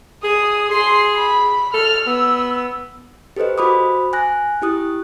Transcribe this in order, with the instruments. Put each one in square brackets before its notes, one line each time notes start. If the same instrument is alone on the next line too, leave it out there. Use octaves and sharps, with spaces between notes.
[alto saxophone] G#4 [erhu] D#6
[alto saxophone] G#4 [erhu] C6
[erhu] B5
[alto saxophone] A4 [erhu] F6
[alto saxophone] B3 [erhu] E6
[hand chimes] G4 A4 B4 C5 D#5
F#4 C5 B5 D6 D#6
G#5 F#6 A#6
E4 G4 D#6 F#6